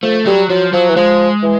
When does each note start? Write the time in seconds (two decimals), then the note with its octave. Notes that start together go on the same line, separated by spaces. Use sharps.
0.02 F3 A3
0.26 F#3 G3
0.50 F3 F#3
0.73 F3 F#3
0.89 E3
0.96 F3 G#3
1.43 E3